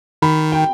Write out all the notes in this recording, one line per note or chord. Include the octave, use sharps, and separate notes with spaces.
D#3 B5
G5